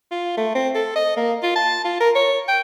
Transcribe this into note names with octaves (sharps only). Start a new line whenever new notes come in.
F4
A3
C4
A4
D#5
A#3
F4
A5
F4
A#4
C#5
G5